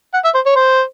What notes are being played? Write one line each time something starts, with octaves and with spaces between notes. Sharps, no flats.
F#5
E5
C5
C#5
C5